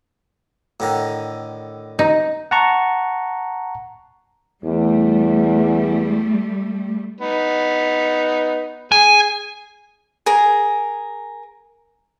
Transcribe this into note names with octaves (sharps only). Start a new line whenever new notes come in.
A2 D3 D#3
D#4
F#5 A5 A#5 C#6
E2 G3 A3
B3 D#4
G#4 G#5
G#4 A#4